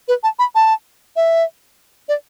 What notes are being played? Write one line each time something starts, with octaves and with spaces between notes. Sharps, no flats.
B4
A5
B5
A5
E5
D5